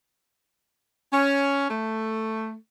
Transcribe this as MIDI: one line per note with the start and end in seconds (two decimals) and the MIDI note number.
1.13 1.66 61
1.70 2.55 57